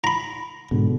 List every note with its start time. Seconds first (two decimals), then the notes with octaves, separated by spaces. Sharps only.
0.04 A#5 B5
0.71 G#2 B2 D3